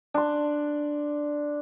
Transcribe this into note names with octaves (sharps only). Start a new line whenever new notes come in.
D4 C6